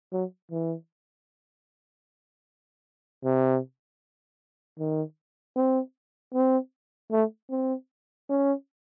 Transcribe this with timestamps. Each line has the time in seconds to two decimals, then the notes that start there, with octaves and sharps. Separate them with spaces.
0.13 F#3
0.51 E3
3.24 C3
4.79 D#3
5.56 C4
6.34 C4
7.12 A3
7.51 C4
8.29 C#4